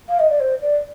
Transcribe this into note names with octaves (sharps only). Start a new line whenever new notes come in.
F5
D#5
D5
C5
D5